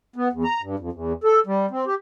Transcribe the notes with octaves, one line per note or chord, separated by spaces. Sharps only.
B3
E2
A#5
G2
F2
E2
A4
G3
C4
G4